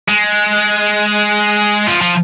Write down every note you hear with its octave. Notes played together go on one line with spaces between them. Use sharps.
G#3
F3
F3